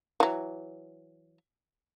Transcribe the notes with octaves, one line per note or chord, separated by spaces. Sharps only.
E3 F#3